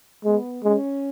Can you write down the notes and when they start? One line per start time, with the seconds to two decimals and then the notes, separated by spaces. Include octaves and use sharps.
0.25 G#3 B3
0.64 G#3 C#4